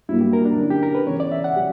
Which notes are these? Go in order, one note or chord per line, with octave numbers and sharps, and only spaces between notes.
G2 F#3 A#3 E4
G4
A#4
D4
D3 F#3 C#4 E4
G4
A#4
B4
C#3 E3 B3 C#5
D5
E5
F#5
C#3 F#3 G4